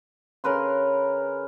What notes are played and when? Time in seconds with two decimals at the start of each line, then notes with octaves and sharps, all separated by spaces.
0.44 C#3 A#4 B4 C6